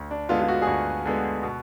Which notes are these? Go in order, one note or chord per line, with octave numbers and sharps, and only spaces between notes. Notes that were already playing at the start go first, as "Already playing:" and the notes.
Already playing: D2
D4
D3 G#3 B3 F4
F4
F#4
G#4
D2 F#4
D3 G#3 B3
B2